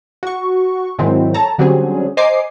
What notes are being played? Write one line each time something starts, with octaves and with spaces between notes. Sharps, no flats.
F#4 C#6
G#2 D#3 F#3 G#3 C4 E4
A4 C#5 A5 A#5
D3 F#3 G3 C4 C#4 G#4
C5 D#5 G#5 A#5 D6 C7